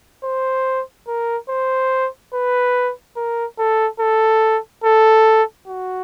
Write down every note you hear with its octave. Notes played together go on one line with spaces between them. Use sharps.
C5
A#4
C5
B4
A#4
A4
A4
A4
F#4